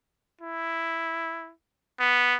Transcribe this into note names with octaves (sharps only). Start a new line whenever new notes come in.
E4
B3